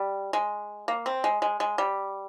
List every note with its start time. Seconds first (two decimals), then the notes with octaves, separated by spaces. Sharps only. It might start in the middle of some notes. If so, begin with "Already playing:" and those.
Already playing: G3
0.33 G#3
0.88 A#3
1.06 C4
1.24 G#3
1.42 G#3
1.60 G#3
1.78 G3